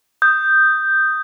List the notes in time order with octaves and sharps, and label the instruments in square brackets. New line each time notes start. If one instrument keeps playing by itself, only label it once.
[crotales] D#6 G6